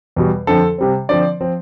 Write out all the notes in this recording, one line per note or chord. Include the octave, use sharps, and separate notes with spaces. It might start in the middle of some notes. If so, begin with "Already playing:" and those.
E2 B2 G3
F2 D3 F3 A4
C3 G3 C4
D3 F3 C4 D5
F3 C4